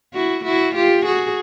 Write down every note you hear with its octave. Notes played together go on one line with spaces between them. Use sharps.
E4 F#4
E4 F#4
F4 G4
F#4 G#4